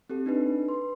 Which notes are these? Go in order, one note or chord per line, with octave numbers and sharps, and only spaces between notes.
C4 G4 A4
D4 D#4 B4
B4 C6